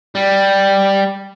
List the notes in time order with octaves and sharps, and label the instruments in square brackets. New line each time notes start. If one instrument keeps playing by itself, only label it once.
[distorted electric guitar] G3